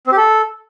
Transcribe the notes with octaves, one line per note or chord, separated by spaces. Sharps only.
C4
G4
A4